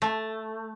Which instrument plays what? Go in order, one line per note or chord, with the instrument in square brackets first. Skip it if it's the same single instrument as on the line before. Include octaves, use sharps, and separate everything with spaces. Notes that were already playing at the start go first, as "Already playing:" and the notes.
[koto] A3